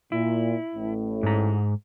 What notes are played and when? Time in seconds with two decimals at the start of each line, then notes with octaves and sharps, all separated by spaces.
0.12 A#2 E4
0.75 A1 A2
1.23 G#2 A#5